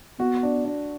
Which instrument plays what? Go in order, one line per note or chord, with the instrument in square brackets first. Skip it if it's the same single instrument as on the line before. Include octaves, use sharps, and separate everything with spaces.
[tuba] B3 [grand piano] F#4
[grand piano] D4
D4